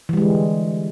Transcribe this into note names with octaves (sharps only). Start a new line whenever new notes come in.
D3 E3 G3 G#3